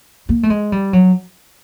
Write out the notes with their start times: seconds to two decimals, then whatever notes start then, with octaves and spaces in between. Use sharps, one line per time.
0.29 A#3
0.43 A3
0.50 G#3
0.72 G3
0.93 F#3